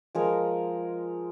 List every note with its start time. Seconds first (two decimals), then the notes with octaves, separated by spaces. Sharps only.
0.15 F3 G#3 A#4